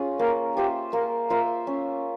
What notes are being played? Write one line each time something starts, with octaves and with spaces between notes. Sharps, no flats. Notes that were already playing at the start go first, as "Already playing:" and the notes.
Already playing: C#4 F4 G#4
A#3 A#4
F4 G4 C5 E5
A#3 A#4
F4 A#4 C5 E5
C#4